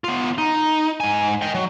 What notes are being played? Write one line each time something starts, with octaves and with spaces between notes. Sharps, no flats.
B3 F4
D#4
G#2 G#5
D#5 G5
F#3